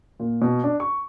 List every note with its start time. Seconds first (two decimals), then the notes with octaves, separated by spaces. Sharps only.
0.20 A#2
0.42 B2
0.64 D4
0.80 C#6